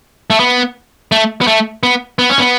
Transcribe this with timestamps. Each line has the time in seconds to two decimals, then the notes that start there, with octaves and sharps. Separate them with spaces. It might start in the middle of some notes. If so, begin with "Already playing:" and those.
0.30 A3
0.40 B3
1.12 A3
1.41 B3
1.47 A3
1.83 B3
2.19 B3
2.30 C#4
2.39 B3